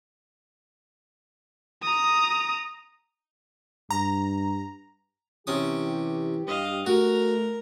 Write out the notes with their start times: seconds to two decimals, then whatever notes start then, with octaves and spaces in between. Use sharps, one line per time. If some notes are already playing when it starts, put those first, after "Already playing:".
1.83 A#5 D#6
3.91 G2 A#5
5.47 C3 E3 C#4 G4 D#6
6.47 G2 D#5 F5
6.86 A3 F#4 A#4 A#5